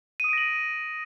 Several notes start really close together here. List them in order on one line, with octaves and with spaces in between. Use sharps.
D#7 D#6 D7 A#6 F#7